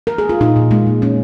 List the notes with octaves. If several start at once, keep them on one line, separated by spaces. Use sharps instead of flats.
A#4
G#4
F4
A#2 D#4
A#2
G#3 A#3
A#2
G#3 C#4